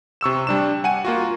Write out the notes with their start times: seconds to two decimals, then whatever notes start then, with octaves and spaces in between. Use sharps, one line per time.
0.21 C3 C#6 E6 E7
0.47 G3 D4 E7
0.84 F#5 G#5 D#7
1.05 A#3 F4 F#4